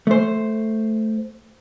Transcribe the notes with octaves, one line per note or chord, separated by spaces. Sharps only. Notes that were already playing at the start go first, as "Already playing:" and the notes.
A3 C5